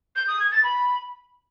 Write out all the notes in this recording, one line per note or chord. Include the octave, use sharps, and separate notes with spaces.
G6
D#6
G#6
A6
B5